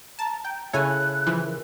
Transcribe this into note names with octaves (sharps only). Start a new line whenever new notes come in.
A5 A#5
G5 A#5
C#3 E4 A4 C#5 G#5 F#6
E3 F3
A#4